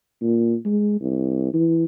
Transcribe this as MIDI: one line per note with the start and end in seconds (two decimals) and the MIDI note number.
0.21 0.55 46
0.65 0.97 56
1.01 1.49 36
1.54 1.85 52